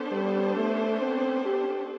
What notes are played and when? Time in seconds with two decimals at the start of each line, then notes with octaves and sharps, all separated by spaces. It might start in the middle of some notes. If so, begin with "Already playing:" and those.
Already playing: B3 D4 A4 C5
0.12 G3
0.56 A3
1.00 C4
1.45 G4